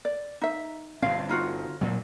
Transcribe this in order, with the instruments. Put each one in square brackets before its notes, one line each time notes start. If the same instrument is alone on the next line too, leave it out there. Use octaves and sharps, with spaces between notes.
[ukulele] D5
D#4 E5
[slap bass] G1 G2 C4 [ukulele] F5
[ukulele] D#4 F4 F#4
[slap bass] A#2 F#3